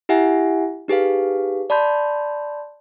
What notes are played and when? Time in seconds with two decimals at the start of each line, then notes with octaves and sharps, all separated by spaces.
0.09 E4 G4 E5 F#5 G#5
0.88 D#4 G4 G#4 B4 F5
1.70 D5 A5 B5 C6 G6